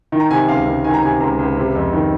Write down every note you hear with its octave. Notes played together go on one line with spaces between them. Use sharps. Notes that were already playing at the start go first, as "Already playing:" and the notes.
D#3
A#5
C3 G#5
C#2 F5
C#2
D#3 G#5
A#5
C3 G#5
C#2 A#5
C#2
C3
F2
D#3